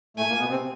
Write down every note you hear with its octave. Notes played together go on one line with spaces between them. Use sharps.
A2 A3 G#5
A#2 A#3
B2 B3
C3 C4